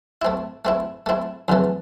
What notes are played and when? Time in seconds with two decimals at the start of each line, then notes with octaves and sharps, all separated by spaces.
0.22 A3 C4 E4
0.65 A3 C4 E4
1.06 A3 C4 E4
1.48 F2 C#3 E3 A3